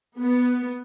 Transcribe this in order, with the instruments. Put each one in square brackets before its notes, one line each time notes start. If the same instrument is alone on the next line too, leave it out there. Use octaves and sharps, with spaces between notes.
[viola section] B3